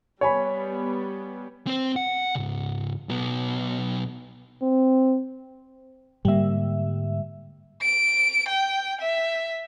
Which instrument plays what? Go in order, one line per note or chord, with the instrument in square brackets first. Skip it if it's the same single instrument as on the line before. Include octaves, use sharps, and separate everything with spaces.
[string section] G3 B3 [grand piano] C#5 G#5 B5
[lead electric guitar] C4 C5
F#5
C#2 G#2
B1 B3
[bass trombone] C4
[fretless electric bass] G#2 D3 A#3 [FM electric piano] G3 E5
[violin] D7
G5
E5